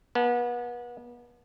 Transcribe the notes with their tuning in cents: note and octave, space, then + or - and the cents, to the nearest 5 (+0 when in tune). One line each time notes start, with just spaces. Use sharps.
B3 -35 A5 -15